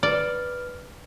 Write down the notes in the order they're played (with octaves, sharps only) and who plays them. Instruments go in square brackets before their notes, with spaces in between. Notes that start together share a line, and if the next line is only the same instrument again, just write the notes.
[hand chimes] B4 F6 [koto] D5